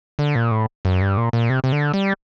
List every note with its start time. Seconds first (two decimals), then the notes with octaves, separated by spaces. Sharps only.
0.19 D3
0.35 A#2
0.51 A2
0.85 F#2
1.02 G2
1.17 A#2
1.33 A#2
1.50 C3
1.64 C3
1.72 D3
1.94 G3